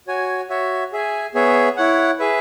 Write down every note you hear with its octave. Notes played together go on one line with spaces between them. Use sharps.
F#4 C#5 G#5
F#4 C#5 E5
G#4 E5 G#5
B3 G#4 C#5 E5
E4 C#5 F#5
G#4 B4 E5